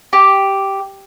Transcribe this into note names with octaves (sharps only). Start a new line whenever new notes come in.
G4